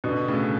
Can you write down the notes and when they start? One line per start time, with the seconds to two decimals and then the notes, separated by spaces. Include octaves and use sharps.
0.04 B2 D3
0.28 A2 C#3